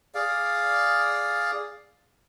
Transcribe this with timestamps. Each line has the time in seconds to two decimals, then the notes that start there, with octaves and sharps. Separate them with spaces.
0.15 G#4 D5 F5